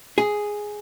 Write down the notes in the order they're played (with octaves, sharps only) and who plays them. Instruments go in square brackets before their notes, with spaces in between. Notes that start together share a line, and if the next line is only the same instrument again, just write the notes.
[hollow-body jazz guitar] G#4